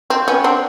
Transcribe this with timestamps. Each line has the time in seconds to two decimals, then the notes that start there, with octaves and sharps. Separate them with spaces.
0.10 C4
0.28 B3 C#4
0.44 C4 D4